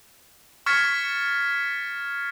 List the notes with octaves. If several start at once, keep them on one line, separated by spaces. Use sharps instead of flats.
C#6 F6 G#6 A6 B6 C#7